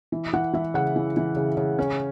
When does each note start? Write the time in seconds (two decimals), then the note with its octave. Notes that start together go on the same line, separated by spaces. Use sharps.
0.12 E3
0.33 E3 F#5
0.53 E3 E5
0.74 C#3 F#5
0.96 E3
1.17 E3
1.36 C#3
1.57 C#3
1.79 C#4